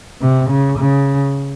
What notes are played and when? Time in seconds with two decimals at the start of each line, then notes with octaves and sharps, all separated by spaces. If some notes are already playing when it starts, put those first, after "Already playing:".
0.22 C3
0.50 C#3
0.78 C#3